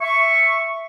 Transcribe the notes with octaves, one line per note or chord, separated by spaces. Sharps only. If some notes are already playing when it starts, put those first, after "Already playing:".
E5 C#6